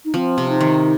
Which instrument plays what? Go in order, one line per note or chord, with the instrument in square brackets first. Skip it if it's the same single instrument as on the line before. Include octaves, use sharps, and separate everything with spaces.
[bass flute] D#4
[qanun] F3 [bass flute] C4
[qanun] C3
[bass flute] D#4
[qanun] D#3